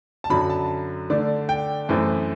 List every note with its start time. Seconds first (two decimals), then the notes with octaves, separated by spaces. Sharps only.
0.24 A5
0.30 F#2 D3 F#3 B5
0.50 A5
1.10 D3 A3 D4
1.49 G5
1.89 F#2 E3 A3 C4